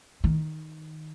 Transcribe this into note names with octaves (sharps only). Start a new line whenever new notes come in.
D#3